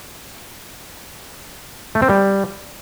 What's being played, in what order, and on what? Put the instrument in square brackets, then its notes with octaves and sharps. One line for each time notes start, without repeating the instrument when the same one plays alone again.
[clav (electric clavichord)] A3
C4
G3